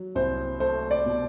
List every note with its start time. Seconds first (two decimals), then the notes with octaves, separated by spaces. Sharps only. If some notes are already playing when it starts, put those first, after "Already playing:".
Already playing: F#3
0.15 C2 C5
0.60 A3 C5
0.91 D5
1.06 B2